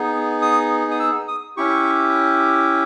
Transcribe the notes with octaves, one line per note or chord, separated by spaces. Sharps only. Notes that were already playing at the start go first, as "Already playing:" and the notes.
Already playing: B3 D#4 G#4
D#6
D#6
E6
D#6
C#4 E4 G4 C#6